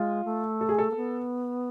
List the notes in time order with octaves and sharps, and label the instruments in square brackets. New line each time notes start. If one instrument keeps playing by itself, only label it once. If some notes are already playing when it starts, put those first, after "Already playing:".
Already playing: [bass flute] G#3 [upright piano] F4
[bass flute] A3
[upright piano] A4
G#4
A4
[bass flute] A#3
B3